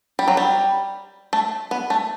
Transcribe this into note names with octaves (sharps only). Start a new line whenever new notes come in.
G3
F#3
G3
A3
B3
A3